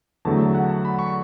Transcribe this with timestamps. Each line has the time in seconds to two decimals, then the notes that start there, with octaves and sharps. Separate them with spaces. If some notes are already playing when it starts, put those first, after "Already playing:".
0.25 E2 D3 F#3 A3 A5
0.55 F#5
0.70 A5
0.85 B5
0.99 C#6